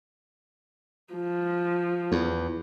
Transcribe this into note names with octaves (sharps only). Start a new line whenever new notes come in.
F3
E2